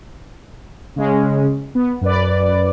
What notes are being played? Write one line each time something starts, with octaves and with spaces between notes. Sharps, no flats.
C#3 G#3 C#4
B3
F#2 B4 D5